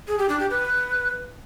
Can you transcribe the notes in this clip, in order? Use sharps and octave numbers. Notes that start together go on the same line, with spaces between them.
G#4
G4
D4
G4
B4